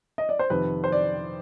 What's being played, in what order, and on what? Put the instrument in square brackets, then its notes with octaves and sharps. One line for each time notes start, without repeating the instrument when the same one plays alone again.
[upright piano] D#5
D5
C5
F2 C3 D#3 B4
C5
D5